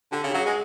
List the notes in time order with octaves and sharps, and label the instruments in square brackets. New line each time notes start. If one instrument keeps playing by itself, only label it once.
[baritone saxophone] D3 [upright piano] G4
[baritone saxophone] C#3
[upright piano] G4
[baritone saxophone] F#3 [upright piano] G#4
[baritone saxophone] G#3 [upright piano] G#4